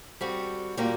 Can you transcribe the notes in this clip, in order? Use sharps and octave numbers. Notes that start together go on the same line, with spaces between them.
G3 C4 F#4 A4
A#2 G3 A#3 F#4